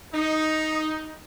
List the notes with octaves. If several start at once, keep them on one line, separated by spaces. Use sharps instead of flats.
D#4